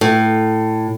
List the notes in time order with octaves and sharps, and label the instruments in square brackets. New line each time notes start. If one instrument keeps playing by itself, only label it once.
[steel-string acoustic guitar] A2